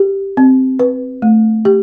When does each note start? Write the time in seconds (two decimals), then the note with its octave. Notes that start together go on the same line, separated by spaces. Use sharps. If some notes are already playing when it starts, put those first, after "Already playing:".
Already playing: G4
0.37 C4
0.79 B4
1.22 A3
1.65 G4